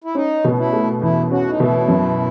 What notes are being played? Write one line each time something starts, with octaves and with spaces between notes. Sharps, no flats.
E4
C#4 D#4
B2
E4
A3
E2 E4
C#4 F#4
D#4
B2 E4
F#2